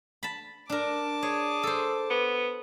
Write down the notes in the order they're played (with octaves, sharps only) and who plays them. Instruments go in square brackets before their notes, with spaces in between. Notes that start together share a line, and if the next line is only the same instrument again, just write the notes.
[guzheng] A5 B5
[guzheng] D4 A#4 [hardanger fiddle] A5 D6
[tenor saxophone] G#4 [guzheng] C#5
[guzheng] A4 C5
[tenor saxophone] B3